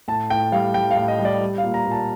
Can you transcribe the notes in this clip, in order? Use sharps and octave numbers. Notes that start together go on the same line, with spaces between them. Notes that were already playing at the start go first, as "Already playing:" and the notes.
A2 A5
A2 G5
G3 F5
G3 G5
F5
A2
D#5
G3
D5
G3
F5
A#2
A#5
A#2
A5